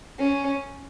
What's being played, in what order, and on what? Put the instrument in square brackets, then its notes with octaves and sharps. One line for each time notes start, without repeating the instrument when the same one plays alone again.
[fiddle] C#4